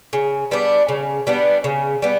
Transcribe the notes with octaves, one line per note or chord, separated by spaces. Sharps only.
C#3
G3 B3 D4
C#3
G3 B3 D4
C#3
G3 B3